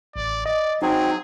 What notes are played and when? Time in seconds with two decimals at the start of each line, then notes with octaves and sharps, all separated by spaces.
0.16 A1 D5
0.46 D5 D#5
0.82 F#3 C4 D#4 G#4